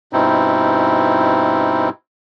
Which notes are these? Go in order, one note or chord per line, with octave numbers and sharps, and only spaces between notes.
G2 B2 C4 D#4 E4